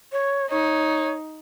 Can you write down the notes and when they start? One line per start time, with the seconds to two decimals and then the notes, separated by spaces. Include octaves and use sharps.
0.12 C#5
0.50 D#4 C#5